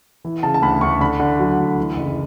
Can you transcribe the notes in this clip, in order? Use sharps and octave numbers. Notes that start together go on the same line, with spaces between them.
E3
C#3 A5
A5
D2 B5
D2 C#6
D3 B5
D3
F#3
D2
E3
F#1